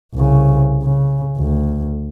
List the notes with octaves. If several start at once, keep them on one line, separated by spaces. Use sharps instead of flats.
C2 C#3
C#3
D2